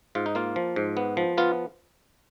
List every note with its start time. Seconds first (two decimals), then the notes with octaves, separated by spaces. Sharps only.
0.15 G#2 F4
0.26 D#4
0.35 A#3 F4
0.56 F3
0.76 G#2
0.97 B3
1.17 F3
1.38 B3 F4